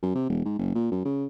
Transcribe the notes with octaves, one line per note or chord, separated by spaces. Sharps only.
F#2
C3
E1
G#2
F#1
A#2
F#2
C#3